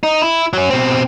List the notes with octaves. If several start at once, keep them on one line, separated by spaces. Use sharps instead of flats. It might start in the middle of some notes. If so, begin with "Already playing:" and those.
D#4
E4
F#3 C#4
B2 C4